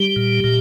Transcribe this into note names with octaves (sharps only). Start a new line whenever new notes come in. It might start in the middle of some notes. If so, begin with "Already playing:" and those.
Already playing: G3 G4
A#2
A#2